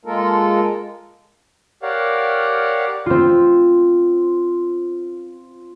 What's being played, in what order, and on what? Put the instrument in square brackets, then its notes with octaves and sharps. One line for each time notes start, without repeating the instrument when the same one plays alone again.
[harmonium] G#3 A#3 F4 A4 A#4
[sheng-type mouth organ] G4 A#4 C#5 D5 F5 F#5
[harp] C4 F4